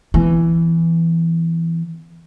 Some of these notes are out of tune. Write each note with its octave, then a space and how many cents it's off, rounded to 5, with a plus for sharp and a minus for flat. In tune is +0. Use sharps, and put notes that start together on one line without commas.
E3 +10 B3 +35